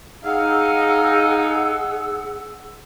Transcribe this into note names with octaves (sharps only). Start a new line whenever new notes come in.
D#4 G#4 F5 F#5 E6